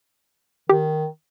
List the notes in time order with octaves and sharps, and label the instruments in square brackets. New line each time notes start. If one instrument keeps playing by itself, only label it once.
[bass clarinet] D#3 [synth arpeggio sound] G4